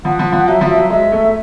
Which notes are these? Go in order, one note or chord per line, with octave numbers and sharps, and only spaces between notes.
F3 F#5
F3
F3
F#3 E5
F3
E5
F#3
G#3 E5
A3